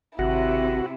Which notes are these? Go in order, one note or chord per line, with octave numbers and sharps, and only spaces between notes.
G#1 C3 E4 F#4 E5